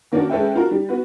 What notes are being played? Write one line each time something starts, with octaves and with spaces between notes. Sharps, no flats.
D#3 A#3 C#4 D4 F#4
G#3 C#4 A4 B4 E5 G5
F4 F#4 A#4
G3
B3 F#4 B4